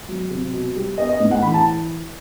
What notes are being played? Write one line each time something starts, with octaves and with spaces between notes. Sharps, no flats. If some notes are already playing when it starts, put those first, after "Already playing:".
F#3
C3
B2
G3
B3 D#5
D#5
A2
F#5
E3 B5
A5